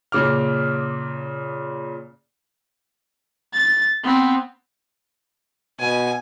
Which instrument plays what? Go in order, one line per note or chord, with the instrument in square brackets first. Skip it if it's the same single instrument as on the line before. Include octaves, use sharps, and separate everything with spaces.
[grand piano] A#2 C#3 D6 F6
[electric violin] A6
B3 C4
[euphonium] B2 [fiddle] G#5